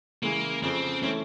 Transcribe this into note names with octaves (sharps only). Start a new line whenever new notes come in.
C#3 E3 G#3 A#3
F2 C#3 F3 C4
E3 A3 C4 C#4